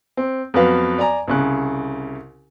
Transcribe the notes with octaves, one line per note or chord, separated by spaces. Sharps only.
C4
F2 F#3 B3 B4 F5
D5 G#5 A#5
C2 C#3 F#6